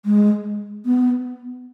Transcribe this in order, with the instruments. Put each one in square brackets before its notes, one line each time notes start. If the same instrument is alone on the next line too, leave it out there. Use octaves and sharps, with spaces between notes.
[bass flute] G#3
B3